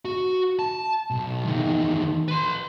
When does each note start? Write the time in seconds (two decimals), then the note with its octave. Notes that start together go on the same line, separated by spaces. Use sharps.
0.05 F#4
0.59 A5
1.10 B1
1.45 E2 D#3
2.28 B4 C6